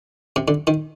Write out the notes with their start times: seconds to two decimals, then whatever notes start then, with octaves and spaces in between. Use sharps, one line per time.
0.36 C3
0.48 D3
0.67 D#3